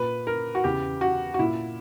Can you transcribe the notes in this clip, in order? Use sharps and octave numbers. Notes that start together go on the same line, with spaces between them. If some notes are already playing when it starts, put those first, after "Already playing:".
Already playing: A#2 B4
A#4
F#4
E2 C#3 E3 G4
F#4
F#4
A#2 E4